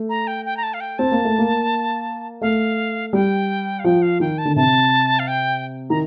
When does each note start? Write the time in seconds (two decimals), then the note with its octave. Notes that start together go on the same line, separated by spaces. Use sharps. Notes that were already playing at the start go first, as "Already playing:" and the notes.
Already playing: A3
0.09 A#5
0.27 G5
0.46 G5
0.57 A#5
0.63 A5
0.74 F5
0.80 G5
0.99 C4 A5
1.12 A#3
1.25 A3
1.38 A#3
2.42 A3 F5
3.13 G3 G5
3.80 F5
3.84 F3 G5
4.02 F5
4.20 D#3 G5
4.38 A5
4.45 D3
4.56 C3 A5
5.19 F5
5.28 G5
5.90 D#3 A#5